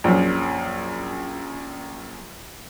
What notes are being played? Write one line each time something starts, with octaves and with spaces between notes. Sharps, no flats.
A#1 F#2